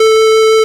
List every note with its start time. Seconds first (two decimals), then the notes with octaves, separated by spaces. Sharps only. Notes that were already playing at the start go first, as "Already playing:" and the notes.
Already playing: A4